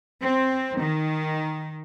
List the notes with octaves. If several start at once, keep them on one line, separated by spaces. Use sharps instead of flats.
C4
D#3